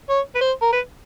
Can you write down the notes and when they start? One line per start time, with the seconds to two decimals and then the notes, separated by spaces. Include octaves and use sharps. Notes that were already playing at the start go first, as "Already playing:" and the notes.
0.10 C#5
0.35 B4
0.41 C5
0.62 A#4
0.73 B4